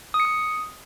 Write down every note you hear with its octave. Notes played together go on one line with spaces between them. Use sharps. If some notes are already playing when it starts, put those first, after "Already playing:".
D#6
C#7
D#6